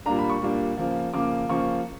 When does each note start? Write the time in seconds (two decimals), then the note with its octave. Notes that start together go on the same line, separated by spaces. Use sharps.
0.06 A#2 G3 A#3 D4 A#5
0.19 B5
0.30 C#6
0.42 A#2 G3 A#3 D4
0.77 C#3 F3 A#3
1.14 C#3 F3 A#3 D6
1.49 C#3 F3 A#3 C#6